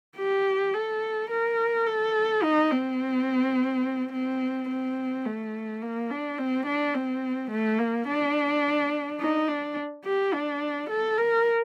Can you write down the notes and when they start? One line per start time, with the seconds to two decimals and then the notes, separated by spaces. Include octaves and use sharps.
0.17 G4
0.74 A4
1.30 A#4
1.87 A4
2.43 D#4
2.72 C4
4.12 C4
4.69 C4
5.26 A3
5.82 A#3
6.10 D4
6.38 C4
6.66 D4
6.94 C4
7.51 A3
7.79 A#3
8.07 D4
9.20 D#4
9.48 D4
10.04 G4
10.33 D4
10.90 A4
11.18 A#4